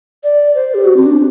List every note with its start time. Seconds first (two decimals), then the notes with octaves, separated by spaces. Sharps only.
0.24 D5
0.55 C5
0.74 G4
0.85 F#4
0.97 C4
1.06 D4